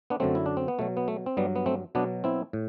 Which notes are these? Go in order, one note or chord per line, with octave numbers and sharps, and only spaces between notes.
B3 D4
F#2 D3 F#3 A3 C4
E4
D4
C4
B3
B2 F#3 A3
B3
A3
C4
G2 F#3 G3 B3
B3
A3 C4
B2 F#3 B3 D4
C4 E4
A2